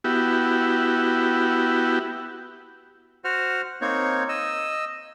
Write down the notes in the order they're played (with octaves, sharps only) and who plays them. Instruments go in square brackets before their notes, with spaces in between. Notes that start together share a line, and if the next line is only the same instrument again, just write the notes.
[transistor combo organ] B3 E4 F#4 G4
[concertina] F#4 C5 F#5 F6
A#3 C4 D#4 C#5
D#5 E6